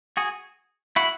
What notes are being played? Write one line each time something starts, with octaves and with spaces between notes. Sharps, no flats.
F#4 G#4
E4 F#4